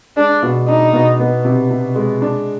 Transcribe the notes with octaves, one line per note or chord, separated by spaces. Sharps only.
G#3 D4
B2
D4 D#4
B2
B3
C3
C3
G#3
D4